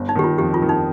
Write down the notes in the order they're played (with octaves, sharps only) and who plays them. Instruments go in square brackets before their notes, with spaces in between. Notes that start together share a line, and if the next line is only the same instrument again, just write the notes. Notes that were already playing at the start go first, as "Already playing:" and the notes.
Already playing: [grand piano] G1
[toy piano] D#4
[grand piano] D#3 [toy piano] G4
[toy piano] F4
[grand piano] F2 [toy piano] G4
[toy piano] F4
[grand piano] D#3
[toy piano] D#4